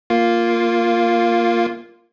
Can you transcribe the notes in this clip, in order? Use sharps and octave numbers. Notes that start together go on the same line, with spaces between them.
A#3 F4